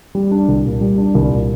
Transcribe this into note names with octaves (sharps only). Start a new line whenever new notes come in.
G3
D4
C2
A#2
G3
D4
C2
A#2